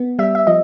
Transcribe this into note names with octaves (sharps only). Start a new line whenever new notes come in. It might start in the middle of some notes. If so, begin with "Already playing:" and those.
Already playing: B3
G3 E5
E5
F3 D#5